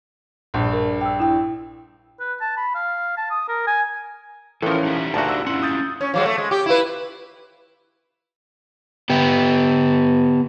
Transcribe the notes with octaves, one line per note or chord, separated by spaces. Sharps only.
A#1 G2
A#4
G5 E6
E4 G5
B4
A5
B5
F5
A5
D#6
A#4
G#5
A2 E3 F3 C#4 A4 A#4
D#4 G4 E5
D2 A#2 F#4 A5
F#5 E6
C#4 E4 F4 F#5 C6
D#6 G6 A6
C#4
F3 F#3 G#3
A3
G#3
G4
E4 F4 B4
B3 G4